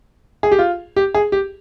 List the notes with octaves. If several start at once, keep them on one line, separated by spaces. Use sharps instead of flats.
G#4
G4
F4
G4
G#4
G4